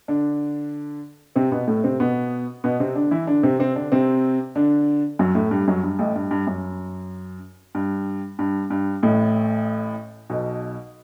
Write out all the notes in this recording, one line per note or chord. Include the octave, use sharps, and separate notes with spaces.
D3 D4
C3 C4
B2 B3
A2 A3
C3 C4
B2 B3
B2 B3
C3 C4
D3 D4
E3 E4
D3 D4
C3 C4
C3 C4
D3 D4
C3 C4
D3 D4
F#2 F#3
A2 A3
G2 G3
F#2 F#3
G2
A1 A2
G2
G2
F#2
G2
G2
G2
A1 A2
B1 B2